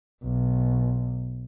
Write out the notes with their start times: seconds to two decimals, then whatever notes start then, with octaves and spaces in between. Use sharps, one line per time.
0.24 B1